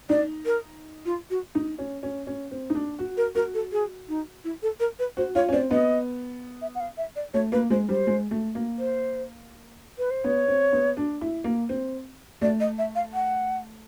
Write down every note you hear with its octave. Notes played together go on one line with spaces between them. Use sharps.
D#4 D5
A#4
F4
F#4
D#4
C#4
C#4
C#4
C4
D#4
D4
F#4
A#4
F#4 A#4
A4
G#4
D#4
E4
A4
A#4
B4
F#4 C5
F4 C#5
C#4
C4 D5
B3 D#5
E5
F#5
F5
E5
D5
A3 C#5
A#3 B4
G#3 C5
G3 C5
G#3
A3
A#3
C5
B4
C5
B3 C#5
C4
B3
D4
E4
A#3
C4
A3 D5
D#5
E5
F5
F#5